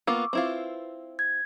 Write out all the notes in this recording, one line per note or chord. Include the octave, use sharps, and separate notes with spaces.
A#3 B3 F4 C#6 D6 E6
C4 E4 F4 B4
G#6